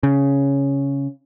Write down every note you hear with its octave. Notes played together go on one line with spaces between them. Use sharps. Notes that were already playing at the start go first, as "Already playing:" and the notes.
C#3